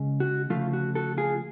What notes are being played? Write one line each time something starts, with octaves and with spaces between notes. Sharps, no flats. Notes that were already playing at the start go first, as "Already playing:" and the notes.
Already playing: C#3 G#3 C#4
F#4
D2 C#3 F3 A3 F4
F#4
F#4 A4
F4 G#4